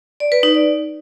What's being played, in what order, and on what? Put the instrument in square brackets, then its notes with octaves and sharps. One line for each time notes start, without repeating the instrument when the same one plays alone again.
[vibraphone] D5
B4
D#4
D5